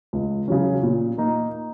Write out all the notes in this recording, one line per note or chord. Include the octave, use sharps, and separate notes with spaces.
C#2
C#3 F#3 C#4
A#2
A#3 D#4